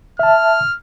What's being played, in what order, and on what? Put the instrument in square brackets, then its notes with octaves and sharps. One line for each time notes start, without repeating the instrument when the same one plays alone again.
[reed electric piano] E5 A5 [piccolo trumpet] F6